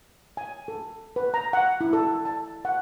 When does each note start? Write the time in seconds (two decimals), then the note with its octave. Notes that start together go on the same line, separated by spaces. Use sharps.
0.37 G#5
0.68 A4
1.16 B4
1.34 A#5
1.53 F#5
1.81 E4
1.93 A4
2.25 A5
2.65 F#5